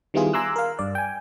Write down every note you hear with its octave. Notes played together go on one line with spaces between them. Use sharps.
D#3 G3 B3 E4 F4 G#4
G#5 A#5 C6 D6 E6 F#6
A#4 F5
G2 D5
G5 G#5